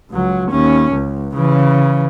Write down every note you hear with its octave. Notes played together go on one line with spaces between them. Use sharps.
C#2 F#3
D#2 C#4
C#2
C#3 E3